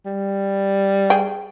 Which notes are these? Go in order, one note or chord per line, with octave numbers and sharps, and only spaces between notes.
G3
G#4 G5